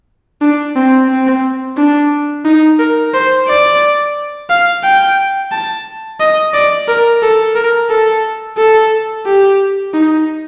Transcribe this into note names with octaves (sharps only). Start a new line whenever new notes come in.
D4
C4
C4
D4
D#4
A#4
C5
D5
F5
G5
A5
D#5
D5
A#4
A4
A#4
A4
A4
G4
D#4